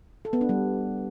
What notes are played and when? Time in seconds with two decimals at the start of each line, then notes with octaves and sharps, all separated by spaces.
0.25 A4
0.33 B3
0.41 D4
0.49 G3